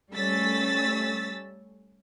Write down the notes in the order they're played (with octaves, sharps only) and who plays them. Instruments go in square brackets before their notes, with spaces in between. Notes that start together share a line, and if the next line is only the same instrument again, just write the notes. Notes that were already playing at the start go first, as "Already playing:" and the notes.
[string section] G3 A3 C#4 E6 A6 B6